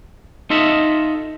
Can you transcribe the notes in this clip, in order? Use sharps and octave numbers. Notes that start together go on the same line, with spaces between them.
D#4 F4 A4 D#5 E5